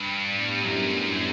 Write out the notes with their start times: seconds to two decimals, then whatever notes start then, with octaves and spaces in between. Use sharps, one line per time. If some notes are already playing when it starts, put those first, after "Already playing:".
Already playing: G2
0.23 A2 G3 B3 D4 G4
0.64 F#2